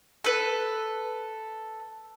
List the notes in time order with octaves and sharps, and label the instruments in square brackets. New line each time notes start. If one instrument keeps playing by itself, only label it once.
[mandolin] A4 B4